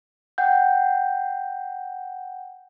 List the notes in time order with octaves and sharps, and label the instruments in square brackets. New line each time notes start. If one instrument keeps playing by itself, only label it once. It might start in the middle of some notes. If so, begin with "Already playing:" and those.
[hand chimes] F#5 G5 G6